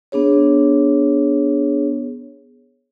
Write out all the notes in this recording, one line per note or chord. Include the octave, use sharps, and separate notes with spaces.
B3 D4 G#4 C#5